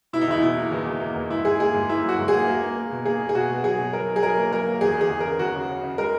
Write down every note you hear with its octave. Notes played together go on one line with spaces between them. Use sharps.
B2 E4
D#4
E2 E4
B2 E4
A#3
E2
E2
A#3
E2
G#2 E4
G#2 G#4
A#3 G#4
G#2
A#3 E4
F#3
F#4
G#2
A#3 G#4
A#3
A#3
A#3
B2
A#3 G#4
A#3
G#4
B2 F#4
B2
F#3 G#4
B2
F#3 A#4
F#3
G#4
F#3 A#4
A#3
F#3 A#4
A#3
E2 G#4
E2 G#4
E2
C#3 A#4
E2 F#4
C#3
C#3
C#3
G#3 A#4